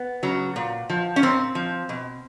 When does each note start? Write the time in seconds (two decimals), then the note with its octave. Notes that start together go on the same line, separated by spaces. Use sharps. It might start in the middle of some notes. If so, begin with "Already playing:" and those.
Already playing: B3
0.23 C#3 F#3
0.56 A#2
0.90 F3
1.16 C#4
1.22 A#2 C4
1.55 F3
1.89 B2